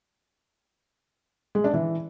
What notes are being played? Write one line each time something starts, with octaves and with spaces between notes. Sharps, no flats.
G#3
D4
E3